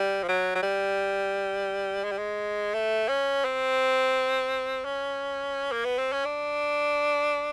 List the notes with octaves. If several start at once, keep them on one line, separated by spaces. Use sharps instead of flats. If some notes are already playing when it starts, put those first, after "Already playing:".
Already playing: G3
F3
F#3
F#3
G3
G#3
G3
G#3
A3
C#4
C4
C#4
A#3
B3
C4
C#4
D4